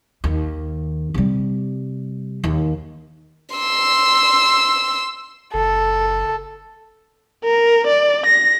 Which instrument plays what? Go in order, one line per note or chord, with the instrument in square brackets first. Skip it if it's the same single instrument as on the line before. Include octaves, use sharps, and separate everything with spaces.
[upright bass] D#2
C3 G3
D#2
[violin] C6 E6
[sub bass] F#1 [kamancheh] A4
[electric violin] A#4
D5
A#6